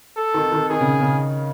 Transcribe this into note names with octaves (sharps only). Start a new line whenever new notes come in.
A4
D#3
D#3
D#3 G#4
C#3
C#3